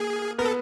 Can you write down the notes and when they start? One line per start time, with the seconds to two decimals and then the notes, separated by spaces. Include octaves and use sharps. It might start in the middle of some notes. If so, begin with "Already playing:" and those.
Already playing: A#3 G#4
0.38 B3 A#4
0.45 A4